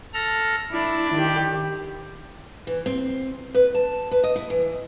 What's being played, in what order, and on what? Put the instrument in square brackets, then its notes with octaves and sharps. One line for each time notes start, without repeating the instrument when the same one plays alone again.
[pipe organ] A4 F6 A#6
[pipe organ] D4 D5 [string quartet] E4
[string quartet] D#3 G4
[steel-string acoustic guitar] E3
C4
B4
A5
B4
D#5
E4
E3